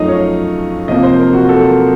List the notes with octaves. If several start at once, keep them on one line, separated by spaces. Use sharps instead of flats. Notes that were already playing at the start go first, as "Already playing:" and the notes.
Already playing: F#2 F3 A3 D#4 D#5 F5
C#5
C3 F3 A#3 D#5
C5
A#4
F#4
A4
A#4